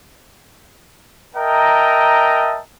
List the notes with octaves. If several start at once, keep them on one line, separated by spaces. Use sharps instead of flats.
A#4 D#5 E5 G5 A5 A#5